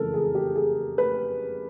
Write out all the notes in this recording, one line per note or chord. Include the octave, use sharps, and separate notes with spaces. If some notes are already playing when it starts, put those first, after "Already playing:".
Already playing: F#1 F2 C#3 E3 G#3 A4 A#4
G#4
G4
G#4
B4